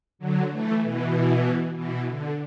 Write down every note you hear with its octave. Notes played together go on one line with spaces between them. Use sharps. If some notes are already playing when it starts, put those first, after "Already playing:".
D3 F#3
E3 A3
B2 E3
B2 E3
D3